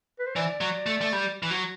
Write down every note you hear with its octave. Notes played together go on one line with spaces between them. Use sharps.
B4
C5
E3 D5
F#3
A3
A3
G3
E3
F#3